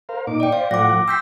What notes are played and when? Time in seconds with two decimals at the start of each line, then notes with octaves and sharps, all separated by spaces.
0.09 A#4 C5 F5
0.27 A#2 D#4 D6
0.40 D5 G5
0.52 C5 D5 F5
0.71 A2 F3 F#5 D6 A#6
1.08 G5 C6 E6 G6 B6